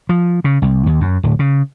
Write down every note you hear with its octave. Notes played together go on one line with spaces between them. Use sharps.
F3
C#3
C2
D#2
F#2
D1
C#3